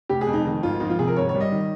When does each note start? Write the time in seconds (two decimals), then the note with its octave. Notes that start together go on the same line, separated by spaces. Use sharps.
0.09 F1 G4
0.21 G#4
0.27 F2
0.33 D#4
0.45 D#3 D#4
0.62 G#1 F4
0.80 F3 D#4
0.90 F4
0.99 C3 G#4
1.07 A#4
1.16 G#1 C#5
1.29 C#5
1.35 G3
1.40 D#5
1.52 D#3